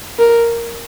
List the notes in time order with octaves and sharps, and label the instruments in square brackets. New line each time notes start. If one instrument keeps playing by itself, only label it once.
[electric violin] A#4